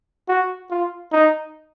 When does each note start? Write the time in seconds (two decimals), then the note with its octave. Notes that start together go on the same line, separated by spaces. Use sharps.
0.29 F#4
0.71 F4
1.13 D#4